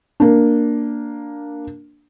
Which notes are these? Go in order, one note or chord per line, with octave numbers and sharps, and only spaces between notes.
A#3 D4